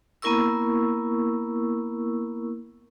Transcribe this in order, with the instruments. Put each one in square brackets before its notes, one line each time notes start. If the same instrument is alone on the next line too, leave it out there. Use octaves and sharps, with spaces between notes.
[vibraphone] A#3 B3 E4 A#4 C#6 E6